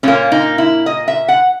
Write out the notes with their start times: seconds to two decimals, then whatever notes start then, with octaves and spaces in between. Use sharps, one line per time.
0.03 A#2 A#3 C#4
0.32 D#4
0.58 E4
0.86 D#5
1.08 E5
1.28 F#5